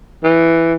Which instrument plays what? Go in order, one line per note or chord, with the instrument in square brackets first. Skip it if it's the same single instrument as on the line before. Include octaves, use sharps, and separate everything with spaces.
[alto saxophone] E3